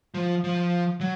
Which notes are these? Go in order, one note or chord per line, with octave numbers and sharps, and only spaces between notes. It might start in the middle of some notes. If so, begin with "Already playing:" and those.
F3
F3
F#3